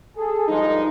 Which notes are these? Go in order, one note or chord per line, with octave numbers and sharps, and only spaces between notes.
G#4 A4
G2 F3 G3 G#3 D#4